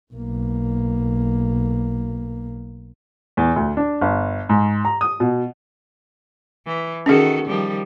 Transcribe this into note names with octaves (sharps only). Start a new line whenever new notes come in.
B1 A#3
E2
D2
D4
G1
G#2
A#5
D#6
B2
E3
D#3 C#4 F#4 G#4 A4
D#3 F3 G3